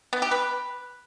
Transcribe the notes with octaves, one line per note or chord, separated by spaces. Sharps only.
B3
G4
B4